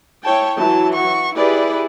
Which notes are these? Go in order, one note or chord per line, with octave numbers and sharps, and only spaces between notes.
E4 C#5 G5 A5
E3 F#3 A5
F#4 C#6
E4 G4 G#4 B4 D5